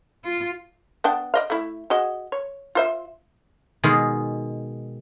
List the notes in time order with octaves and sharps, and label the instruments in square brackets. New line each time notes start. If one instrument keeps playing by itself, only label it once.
[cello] F4
[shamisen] B3 D4 G5
D5 D#5 F5
A3 E4
F#4 G#4 D#5
C#5
F4 C5 E5
[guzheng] B2 D#3 G#3